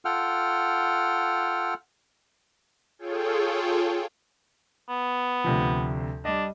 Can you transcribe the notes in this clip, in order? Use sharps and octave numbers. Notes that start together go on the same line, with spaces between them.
F4 A4 F#5 G5 F6
F4 G#4 A4 C#5 G5
B3
D2 C3 F3
G3 D4 D#5